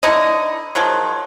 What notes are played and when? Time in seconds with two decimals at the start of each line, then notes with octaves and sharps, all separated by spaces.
0.03 D3 D#4 E4 D#5
0.75 D#3 F3 F#3 G#3